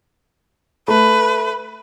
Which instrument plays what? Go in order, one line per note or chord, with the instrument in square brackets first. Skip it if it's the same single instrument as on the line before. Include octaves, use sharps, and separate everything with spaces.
[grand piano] A3 [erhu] B4